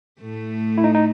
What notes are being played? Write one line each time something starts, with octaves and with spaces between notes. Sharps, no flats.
A2 A3
E4
D#4
D#4